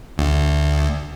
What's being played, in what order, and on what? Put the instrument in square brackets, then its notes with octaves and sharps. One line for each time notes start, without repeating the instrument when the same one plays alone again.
[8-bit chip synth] D2